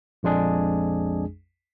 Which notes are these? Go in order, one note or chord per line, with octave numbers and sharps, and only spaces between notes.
A#1 F2 G#3 D4 G#4